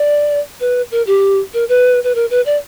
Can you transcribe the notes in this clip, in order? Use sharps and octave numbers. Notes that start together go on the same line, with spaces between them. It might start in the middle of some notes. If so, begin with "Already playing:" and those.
Already playing: D5
B4
A#4
G4
A#4
B4
B4
A#4
B4
D5